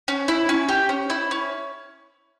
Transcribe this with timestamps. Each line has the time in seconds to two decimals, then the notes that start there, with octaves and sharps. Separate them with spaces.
0.08 C#4
0.28 E4
0.49 C#4
0.69 G4
0.89 C#4
1.10 E4
1.31 C#4